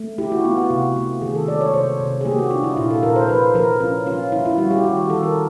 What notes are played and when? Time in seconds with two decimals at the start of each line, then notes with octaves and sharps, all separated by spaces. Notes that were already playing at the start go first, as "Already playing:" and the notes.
Already playing: A3
0.18 E4 G4
0.32 F#4
0.44 B3 F4
0.57 F#4
0.70 C3
0.96 A3
1.22 D#3 G#4
1.35 A4
1.48 G#3 D5
1.61 C#5
1.74 C3 C5
2.00 C3
2.21 G#4
2.25 A#3 G4
2.38 F#4
2.51 D4 F4
2.64 E4
2.77 A#2 F4
2.90 A4
3.03 A#2 A#4
3.16 C5
3.29 F3 B4
3.54 F3 A#4
3.80 C#4 F4
4.06 C#4 F4
4.32 E4
4.45 F4
4.58 G3 F#4
4.71 G4
4.84 D#3 F#4
4.97 G4
5.10 D#3 A4
5.23 A#4